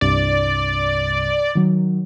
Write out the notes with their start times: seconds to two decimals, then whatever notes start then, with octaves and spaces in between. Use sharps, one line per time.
0.01 C2 G2 C3 D5
1.55 D#3 F#3